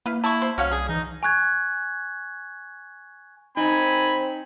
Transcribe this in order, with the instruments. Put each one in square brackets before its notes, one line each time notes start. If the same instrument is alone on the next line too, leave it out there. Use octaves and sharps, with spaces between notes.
[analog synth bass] A#3 [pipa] E4 B4 F5
[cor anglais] E4 [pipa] A5 C#6
[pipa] C5
[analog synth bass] C2 [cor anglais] C#4 [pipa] F#4 C#5 F5
[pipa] D4 [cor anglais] G#4
[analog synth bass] E3 [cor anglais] D#4
[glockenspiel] G#5 C#6 F#6 G#6
[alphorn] C4 [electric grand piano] D#4 [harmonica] G#5 B5